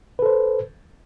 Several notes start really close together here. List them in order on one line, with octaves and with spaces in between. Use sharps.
B4 A4 C5